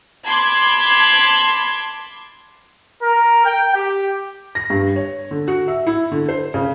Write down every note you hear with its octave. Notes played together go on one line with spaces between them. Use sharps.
A5 B5 C6 D6 G#6
A#4
G5
G4
A#6
G2
C#5
D3
F#4
E5
E4
D3
C5
C#3